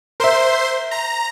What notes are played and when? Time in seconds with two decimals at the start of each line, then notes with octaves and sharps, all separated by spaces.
0.20 A#4 C5 E5 C6
0.91 A#5